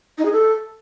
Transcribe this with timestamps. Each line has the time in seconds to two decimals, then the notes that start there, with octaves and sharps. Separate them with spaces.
0.18 D#4
0.25 G#4
0.32 A4